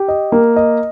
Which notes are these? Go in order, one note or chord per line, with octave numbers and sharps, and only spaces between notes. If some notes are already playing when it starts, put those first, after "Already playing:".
Already playing: G4
D#5
A#3
D#5